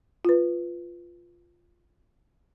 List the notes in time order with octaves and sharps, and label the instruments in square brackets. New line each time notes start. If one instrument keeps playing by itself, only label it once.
[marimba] F4 B4